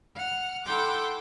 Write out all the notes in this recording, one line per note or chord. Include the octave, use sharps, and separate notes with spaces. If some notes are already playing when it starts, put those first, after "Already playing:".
F#5 F6
E4 A4 F#5 G5 C6 D6